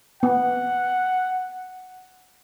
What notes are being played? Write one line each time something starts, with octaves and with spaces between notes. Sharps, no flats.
B3 F#5